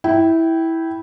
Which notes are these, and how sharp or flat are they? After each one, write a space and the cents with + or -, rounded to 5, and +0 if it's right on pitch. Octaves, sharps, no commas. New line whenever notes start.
E4 -10 G5 -15